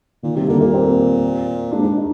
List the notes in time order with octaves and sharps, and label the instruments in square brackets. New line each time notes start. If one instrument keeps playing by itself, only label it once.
[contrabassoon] A#2 [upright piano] D#3
[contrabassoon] C3 [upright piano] G3
[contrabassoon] D3 [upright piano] A#3
[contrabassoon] A#2 [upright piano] A#3
[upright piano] C4
[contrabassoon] G#2 [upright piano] D4
[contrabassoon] G#2
[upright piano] D#4